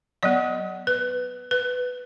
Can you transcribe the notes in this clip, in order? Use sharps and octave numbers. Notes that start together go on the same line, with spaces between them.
F#3 B3 D#5
B4
B4